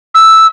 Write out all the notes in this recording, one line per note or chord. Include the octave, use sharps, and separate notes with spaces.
E6